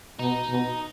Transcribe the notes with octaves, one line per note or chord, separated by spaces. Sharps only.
B2 D#4
B2